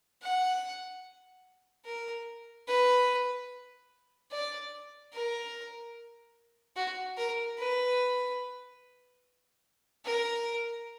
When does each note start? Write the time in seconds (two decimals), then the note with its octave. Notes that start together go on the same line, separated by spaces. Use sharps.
0.22 F#5
1.85 A#4
2.67 B4
4.31 D5
5.13 A#4
6.76 F#4
7.17 A#4
7.58 B4
10.05 A#4